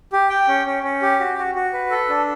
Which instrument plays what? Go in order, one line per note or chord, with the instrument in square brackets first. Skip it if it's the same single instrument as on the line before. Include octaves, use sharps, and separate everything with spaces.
[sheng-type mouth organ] G4
G5
C#4
C#4
C#4
G4
F#4
F#4
F#4
B4
A4
D4